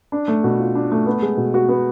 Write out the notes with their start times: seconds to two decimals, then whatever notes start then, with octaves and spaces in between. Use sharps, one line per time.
0.12 D4
0.28 A3
0.44 B2
0.60 F4
0.75 D4
0.92 A3
1.06 B3
1.22 G#3
1.37 B2
1.54 F#4
1.68 B3